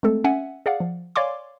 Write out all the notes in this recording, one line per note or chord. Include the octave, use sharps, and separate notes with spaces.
G#3 A3 C4 A4
C#4 E5 F#5 G#5
G#4 D5 F5 F#5
F3
C#5 D5 F5 G#5 C6 D6